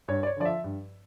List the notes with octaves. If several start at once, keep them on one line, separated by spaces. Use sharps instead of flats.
G2 C#5
D5
C#5
D3 F3 D5
E5
G2